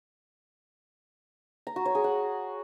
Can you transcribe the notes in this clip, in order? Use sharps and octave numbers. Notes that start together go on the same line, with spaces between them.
A#5
F#4
C#5
G#4
F#5